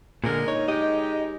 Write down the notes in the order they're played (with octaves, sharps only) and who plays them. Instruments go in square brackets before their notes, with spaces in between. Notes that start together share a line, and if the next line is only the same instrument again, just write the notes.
[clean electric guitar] A#2 D3 [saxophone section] G#3 D4 A#4
[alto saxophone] D#4 [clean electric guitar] C#5
[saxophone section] G#3 G4 [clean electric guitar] D#5